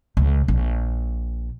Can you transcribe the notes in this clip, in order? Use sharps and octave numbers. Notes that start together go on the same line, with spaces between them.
C#2
A#1